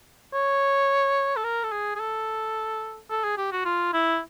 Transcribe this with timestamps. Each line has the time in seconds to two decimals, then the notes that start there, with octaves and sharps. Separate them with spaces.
0.33 C#5
1.36 A4
1.44 A#4
1.63 A4
1.72 G#4
1.95 G#4
2.00 A4
3.10 A4
3.24 G#4
3.38 G4
3.52 F#4
3.65 F4
3.94 E4